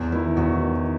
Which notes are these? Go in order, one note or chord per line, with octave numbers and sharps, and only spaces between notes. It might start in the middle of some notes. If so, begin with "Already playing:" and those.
Already playing: E2
D#3 E4
E2 F#4
D#3